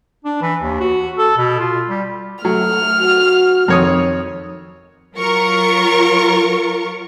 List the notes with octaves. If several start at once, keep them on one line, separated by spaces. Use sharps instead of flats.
D4
E3
D#2
F#4
A4
B2
F4
G3
F#3 A3 F6
F#4
F2 D#3 C#5 D#6
F#3 F4 A#4 C#6